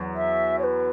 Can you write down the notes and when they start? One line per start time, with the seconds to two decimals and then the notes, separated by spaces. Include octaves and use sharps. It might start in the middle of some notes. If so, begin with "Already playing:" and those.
Already playing: E2 F#3
0.15 E5
0.58 C#5
0.63 B4